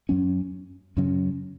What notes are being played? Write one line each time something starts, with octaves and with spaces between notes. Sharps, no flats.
F#2 F#3 C#4
F#2 C#3 F#3 C#4